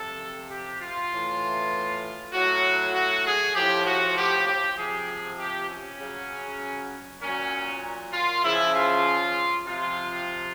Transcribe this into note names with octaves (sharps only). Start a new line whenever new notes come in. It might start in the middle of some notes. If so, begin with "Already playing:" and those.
Already playing: C3 F3 A4
G4
F4
A2 E3
A2 F#3 F#4
F#4
G#4
A2 F3 G4
F#4
G4
G4
C3 F3 G#4
G4
C#4
C#3 F#3
A#2 F#3 C#4
F4
C#3 F3 E4
F4
C3 F3 F4